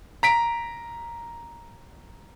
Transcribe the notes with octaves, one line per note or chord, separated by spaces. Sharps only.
A#5 B6 D7